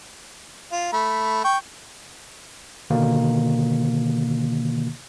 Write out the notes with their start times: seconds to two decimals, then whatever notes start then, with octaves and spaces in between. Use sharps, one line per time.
0.72 F4
0.93 A3 B5
1.44 G5 C#6
2.90 B2 D3 D#3 A#3